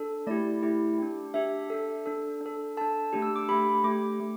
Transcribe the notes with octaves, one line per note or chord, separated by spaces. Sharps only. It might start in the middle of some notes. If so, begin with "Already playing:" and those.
Already playing: D4 A4
A3 E4 G4 D5
A3 E4 G4
D4 G4
D4 G4 E5
D4 A4
D4 A4
D4
A4
D4 A4 A5
A3 D4 G4
E6
D6
A3 D4 G4 B5
A3 G4 D6
A3